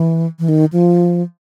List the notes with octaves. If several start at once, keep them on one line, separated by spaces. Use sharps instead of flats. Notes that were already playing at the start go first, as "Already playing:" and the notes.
Already playing: E3
E3
D#3
F3